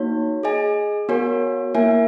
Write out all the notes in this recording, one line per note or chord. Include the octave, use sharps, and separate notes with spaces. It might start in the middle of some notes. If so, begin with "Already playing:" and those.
Already playing: A#3 D#4 F#4 C#5
G#4 D#5 G#5
B3 F#4 A#4 C#5 G#5
A#3 E4 A#4 E5 G#5